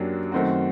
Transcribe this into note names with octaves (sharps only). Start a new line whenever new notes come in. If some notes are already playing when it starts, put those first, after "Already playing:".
Already playing: F#2 F#3 A#3 D4 G4
F#2 D#3 A3 C4 F#4